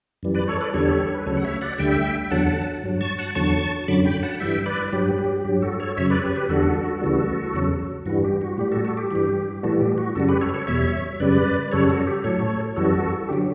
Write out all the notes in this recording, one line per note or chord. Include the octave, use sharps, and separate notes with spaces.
F#2 E3 G3
B4 D5
A4 C#5
B4 D5
E2 D3 G3 A4 C#5
G4
A4
B4
D2 C#3 F#3 A4 C#5
F#5
C#5 E5
D5 F#5
D2 D3 G3 E5 G5
E2 D3 F#3 F#5 A5
G2 F#3
A5 C#6
F#5 A5
E2 D3 F#3 A5 C#6
F#2 D3 F#3 B5 D6
G5 B5
F#5 A5
G2 E3 G3 E5 G5
B4 D5
G2 F#3 G4
G4
G2 F#3 G4
F#4 A4
A4 C#5
F#2 C#3 F#3 C#5 E5
B4 D5
G4 B4
G4 B4
E2 D3 G3 F#4 A4
D2 C#3 E3 G3
E2 C#3 F#3
G2 E3 G3 F#4
G4
F#4
A2 G3 G4
F#4 A4
F#4 A4
G4
G2 E3 G3
A2 E3 G3 F#4 A4
G4
F#4
F#2 C#3 G3 F#4 A4
G4 B4
A4 C#5
A4 C#5
E2 B2 G3 C#5 E5
F#2 C#3 G3 B4 D5
F#2 C#3 G3 A4 C#5
F#4 A4
G4
A2 F#3 A4 C#5
F#2 E3 G3 F#4 A4
D3 F#3 G4